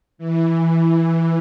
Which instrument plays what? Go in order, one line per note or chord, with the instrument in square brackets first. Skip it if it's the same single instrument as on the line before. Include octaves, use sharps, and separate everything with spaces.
[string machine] E3
E3